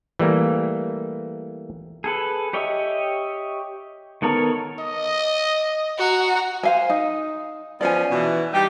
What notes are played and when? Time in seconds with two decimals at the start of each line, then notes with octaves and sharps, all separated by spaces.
0.19 E3 G3 A3 A#3
2.04 G#4 A4 B4
2.53 G4 C#5 D#5 E5
4.22 D#3 B3 A4 A#4 C#5
4.80 D#5
5.98 F#4 A#5
6.63 C5 F5 G#5
6.90 D#4
7.81 F3 B3 C#4 D5 G#5
8.10 B2 E3
8.53 G3 D#4 G4